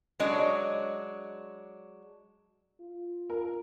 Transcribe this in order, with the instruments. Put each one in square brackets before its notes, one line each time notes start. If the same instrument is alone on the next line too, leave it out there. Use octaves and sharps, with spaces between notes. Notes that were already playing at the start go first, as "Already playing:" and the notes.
[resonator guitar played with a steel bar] F#3 G#3 D4 C#5 D#5
[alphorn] F4
[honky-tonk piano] A#4